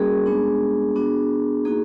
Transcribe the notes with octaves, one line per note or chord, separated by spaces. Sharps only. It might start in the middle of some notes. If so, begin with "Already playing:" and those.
Already playing: G3 A#3 C#4 F#4 G#4 A#4
G#3 B3 D4
B3 D4 F#4
A#3 D#4 F#4 G#4